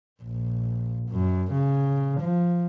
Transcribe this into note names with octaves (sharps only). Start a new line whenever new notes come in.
A#1
F#2
C#3
F3